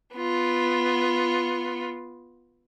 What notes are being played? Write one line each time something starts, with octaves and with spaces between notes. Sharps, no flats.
B3 F4